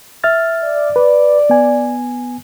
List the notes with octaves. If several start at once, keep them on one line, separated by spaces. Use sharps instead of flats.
E5 F6 A6
D5
B4
B3 G#5